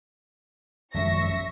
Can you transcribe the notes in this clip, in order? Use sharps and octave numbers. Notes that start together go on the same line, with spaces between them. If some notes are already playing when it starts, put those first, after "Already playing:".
G#1 F#2 F3 E5 C#6 A#6